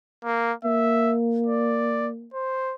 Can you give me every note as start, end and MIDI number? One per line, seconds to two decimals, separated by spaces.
0.25 0.52 58
0.65 2.29 58
0.65 1.14 76
1.47 2.09 74
2.34 2.75 72